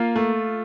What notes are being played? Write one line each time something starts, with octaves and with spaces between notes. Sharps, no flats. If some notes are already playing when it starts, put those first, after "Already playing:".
Already playing: A#3 F4
A3